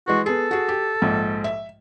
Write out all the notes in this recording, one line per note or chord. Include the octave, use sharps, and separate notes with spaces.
E3 G#3 F#4
B3 G#4 A4
F#4 G#4
G4
A#1 G#2
E5